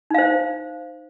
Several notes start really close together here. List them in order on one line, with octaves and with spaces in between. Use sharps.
D#4 F5 C5